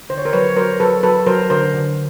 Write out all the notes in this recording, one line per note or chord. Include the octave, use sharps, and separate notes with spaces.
D3 C5
C#5
A#4 C5
F#3 B4 C#5
F#3 A#4 C5
F#3 A4 B4
F#3 A4 B4
F#3 A#4 C5
D3 A#4 C5
D3